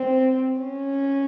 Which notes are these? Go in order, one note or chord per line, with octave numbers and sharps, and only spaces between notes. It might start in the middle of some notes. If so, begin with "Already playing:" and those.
Already playing: C4
C#4